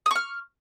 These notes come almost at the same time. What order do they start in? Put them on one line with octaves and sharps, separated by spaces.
D#6 C#6 F6